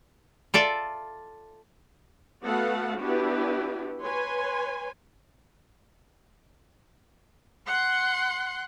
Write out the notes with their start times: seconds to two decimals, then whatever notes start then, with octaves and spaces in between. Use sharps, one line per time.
0.54 F4 A4 D5 E5
2.44 A3 B3 F#4 A4 F5 F#5
2.99 B3 D4 E4 F#4 G4 B4
4.01 B4 C#5 G#5 C6
7.66 F#5 C6 F#6